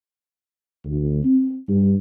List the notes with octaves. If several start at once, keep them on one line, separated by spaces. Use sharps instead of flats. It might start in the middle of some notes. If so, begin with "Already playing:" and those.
D2
C4
G2